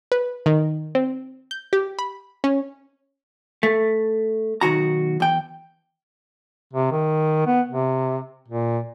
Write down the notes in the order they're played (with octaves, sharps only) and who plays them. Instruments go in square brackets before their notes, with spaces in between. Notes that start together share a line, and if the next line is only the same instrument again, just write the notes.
[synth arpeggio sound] B4
D#3
C4
G6
G4
B5
C#4
[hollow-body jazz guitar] A3
B1 D#3 F#4 A#5
E2 G5
[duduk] C3
D#3
B3
C3
A#2